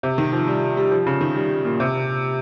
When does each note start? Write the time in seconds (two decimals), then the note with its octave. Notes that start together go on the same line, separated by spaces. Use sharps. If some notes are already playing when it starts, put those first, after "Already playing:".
0.03 C3
0.18 D#3
0.33 F3
0.47 G3
0.77 G3
0.92 F3
1.06 C#3
1.21 D#3
1.35 G3
1.65 A#2
1.80 C3